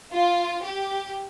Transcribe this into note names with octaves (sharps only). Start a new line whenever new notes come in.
F4
G4